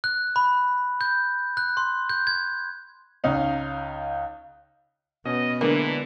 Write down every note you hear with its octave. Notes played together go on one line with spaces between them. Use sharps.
F#6
B5
G6
F#6
C6
G6
G#6
C#2 C#4 D#4 F5
B2 B3 C#4 D#5
D3 E3 G#3 A#3 D4